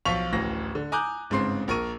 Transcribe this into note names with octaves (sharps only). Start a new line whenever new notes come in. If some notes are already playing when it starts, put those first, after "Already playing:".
B1 F3 F4 C#6 B6 F7
D1 A1 A#6
D3
G#5 A#5 D6 D#6 F#6 G6
G1 G#2 C#3 C4 C6 C7
A#1 A#4 C#6 D#7